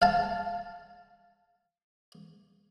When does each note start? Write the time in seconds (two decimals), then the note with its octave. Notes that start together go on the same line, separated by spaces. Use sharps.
0.02 F5 A5